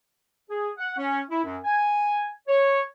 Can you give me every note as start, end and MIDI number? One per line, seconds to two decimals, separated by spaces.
0.50 0.70 68
0.78 0.94 78
0.98 1.21 61
1.30 1.41 64
1.44 1.57 42
1.64 2.27 80
2.48 2.81 73